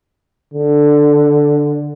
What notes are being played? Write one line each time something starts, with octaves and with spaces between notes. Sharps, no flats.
D3